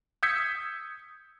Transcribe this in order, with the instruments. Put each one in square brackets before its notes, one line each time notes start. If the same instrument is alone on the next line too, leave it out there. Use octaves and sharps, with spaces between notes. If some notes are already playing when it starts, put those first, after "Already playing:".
[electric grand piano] D#6 E6 G6 G#6 B6 C#7